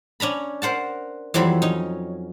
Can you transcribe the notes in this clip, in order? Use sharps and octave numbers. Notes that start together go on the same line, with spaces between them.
C#4 D4 A#5 B5
A#4 C5 F#5 A5
F2 E3 F#3 G3 C5 B5
C#4 D#4